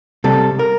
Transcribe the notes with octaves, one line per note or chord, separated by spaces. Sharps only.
C3 G3 A4
A#4